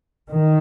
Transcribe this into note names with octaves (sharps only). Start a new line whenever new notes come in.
D#3